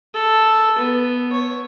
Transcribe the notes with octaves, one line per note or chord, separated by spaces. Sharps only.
A4
B3
C#5